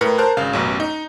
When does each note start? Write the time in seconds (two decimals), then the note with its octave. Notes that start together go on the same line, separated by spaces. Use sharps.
0.01 A2 A#4 B4 C#7
0.18 A#4 C5 A5 F#6
0.37 G#1 C#3 F5
0.53 A1 F#2 B2
0.80 D#4